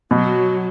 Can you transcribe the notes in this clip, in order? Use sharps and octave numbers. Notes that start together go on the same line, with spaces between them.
B2 F#3